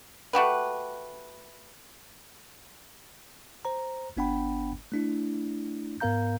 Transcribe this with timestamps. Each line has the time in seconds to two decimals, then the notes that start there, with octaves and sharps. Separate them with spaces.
0.33 A3 F#4 G4 B4
3.65 C5 A#5
4.17 G1 B3 D4 F#5 G5 B5
4.92 A3 D4 E4
6.00 G#2 B3 A#4 F5 A#5 G6